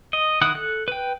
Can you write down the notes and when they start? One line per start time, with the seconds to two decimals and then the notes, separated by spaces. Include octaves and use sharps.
0.13 D#5
0.41 D#3 E4 F#5 D#6 F#6
0.55 A4 F#6
0.88 B4 G5